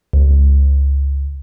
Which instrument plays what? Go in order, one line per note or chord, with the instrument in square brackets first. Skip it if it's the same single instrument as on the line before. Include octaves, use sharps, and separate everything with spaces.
[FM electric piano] C#2